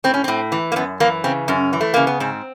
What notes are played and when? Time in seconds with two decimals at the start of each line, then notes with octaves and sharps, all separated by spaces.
0.04 A2 C4
0.14 C#4
0.24 A2 C4
0.52 E3
0.72 A#3
0.76 F#2 B3
1.00 E3 A#3
1.24 C#3 C4
1.48 F#2 C#4
1.73 E3
1.81 A3
1.94 C#3 A#3
2.07 B3
2.20 G#2 C4